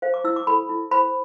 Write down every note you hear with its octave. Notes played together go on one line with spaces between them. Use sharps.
C5 F5
D6
E4 E6
D6
A4 B5
E4
C5 B5